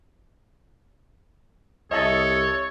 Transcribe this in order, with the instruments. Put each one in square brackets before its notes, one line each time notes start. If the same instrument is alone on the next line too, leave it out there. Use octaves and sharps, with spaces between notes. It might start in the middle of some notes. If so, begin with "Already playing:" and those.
[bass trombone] C2 [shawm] A4 [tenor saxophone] C#5 [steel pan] D#5 E5 A5